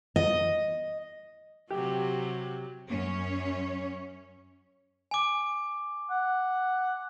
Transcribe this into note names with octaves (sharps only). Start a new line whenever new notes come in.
D#5
C3 F#3 G4
F#2 C#4 C#5
G#5 D6
F#5